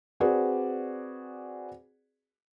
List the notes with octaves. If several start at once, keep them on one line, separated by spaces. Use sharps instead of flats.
C4 F#4 G#4 B4 D5